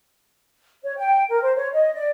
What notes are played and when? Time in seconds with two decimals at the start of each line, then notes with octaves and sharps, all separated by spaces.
0.83 C#5
0.97 G5
1.29 A#4
1.42 C5
1.56 C#5
1.74 D#5
1.95 D5